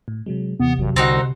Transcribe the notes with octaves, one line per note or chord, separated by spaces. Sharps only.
A2
C3 F#3 G#3
D#2 C3 E3 B3
G#1 F2 F#3
C2 D3 C4 D#4 F#4 F#5